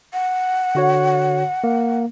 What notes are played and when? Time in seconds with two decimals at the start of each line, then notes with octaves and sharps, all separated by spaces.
0.13 F#5
0.75 D3 F#4 C#5
1.64 A#3